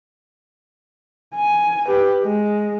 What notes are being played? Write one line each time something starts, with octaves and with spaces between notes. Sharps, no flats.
G#5
G4 B4
G#3